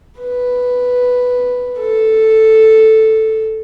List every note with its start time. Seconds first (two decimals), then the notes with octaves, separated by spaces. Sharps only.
0.21 B4
1.78 A4